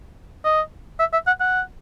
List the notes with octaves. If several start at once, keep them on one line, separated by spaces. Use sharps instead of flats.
D#5
E5
E5
F#5
F#5